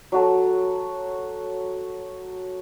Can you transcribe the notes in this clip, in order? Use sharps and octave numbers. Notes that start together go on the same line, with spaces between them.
F#3 F#4 A4